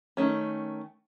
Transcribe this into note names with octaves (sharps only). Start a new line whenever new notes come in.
D#3 A3 C#4